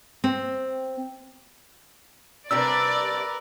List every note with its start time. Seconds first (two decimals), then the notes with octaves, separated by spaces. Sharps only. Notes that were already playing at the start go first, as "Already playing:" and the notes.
0.24 C4
2.51 C3 G3 D4 A#4 B4 D5 E6